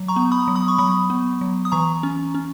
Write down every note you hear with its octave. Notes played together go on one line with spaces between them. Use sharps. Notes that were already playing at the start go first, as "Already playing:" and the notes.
Already playing: F#3
A#5 C#6
B3
B5 D#6
F#3
B5 D#6
C#6
F#3 B5 D#6
B3
F#3
D#6
E3 A#5 C#6
C#4
C#4